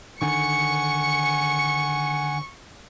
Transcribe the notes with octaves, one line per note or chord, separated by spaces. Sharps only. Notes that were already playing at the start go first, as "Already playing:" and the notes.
D3 D#3 F#5 G#5 C#6 C#7